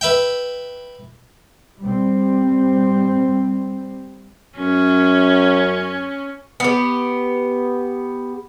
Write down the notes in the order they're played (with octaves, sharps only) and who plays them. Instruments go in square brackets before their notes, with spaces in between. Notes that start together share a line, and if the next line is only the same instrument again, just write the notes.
[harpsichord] B4 E5 G5
[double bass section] G3 C4
[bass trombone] F#2 [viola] C#4
[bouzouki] B3 G4